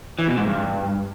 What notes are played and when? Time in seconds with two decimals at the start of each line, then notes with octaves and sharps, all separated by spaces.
0.19 E3
0.28 B2
0.37 G#2
0.47 G2